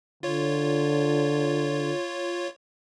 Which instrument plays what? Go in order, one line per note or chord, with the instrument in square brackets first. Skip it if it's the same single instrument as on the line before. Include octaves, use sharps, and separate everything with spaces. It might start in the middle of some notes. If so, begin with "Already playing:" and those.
[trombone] D3 [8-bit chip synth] F4 C#5